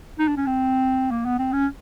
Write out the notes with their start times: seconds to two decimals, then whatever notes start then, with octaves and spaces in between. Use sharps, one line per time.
0.19 D#4
0.28 D4
0.37 C#4
0.47 C4
1.11 A#3
1.25 B3
1.39 C4
1.53 C#4